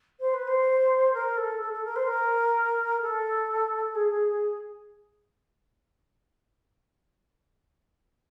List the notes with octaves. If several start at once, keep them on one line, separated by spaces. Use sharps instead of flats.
C5
B4
C5
A#4
A4
A4
A4
A#4
C5
A#4
A4
G#4